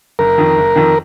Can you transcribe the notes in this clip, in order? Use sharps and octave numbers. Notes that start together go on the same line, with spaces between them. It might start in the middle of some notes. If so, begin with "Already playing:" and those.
F#1 A#4
F2 D#3
F#1
F2 D#3